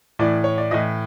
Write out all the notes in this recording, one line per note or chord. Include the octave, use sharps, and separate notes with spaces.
A2 E3 D5
C#5
D5
A2 E3 D#5